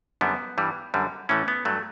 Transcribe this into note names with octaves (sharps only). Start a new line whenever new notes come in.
F#2 D3 G3 B3
G2 E3 G3
F#2 D3 G3
A2 E3 A3 C#4
B3
G2 F#3 A3